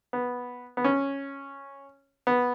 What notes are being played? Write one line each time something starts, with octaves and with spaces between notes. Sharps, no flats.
B3
B3
C#4
B3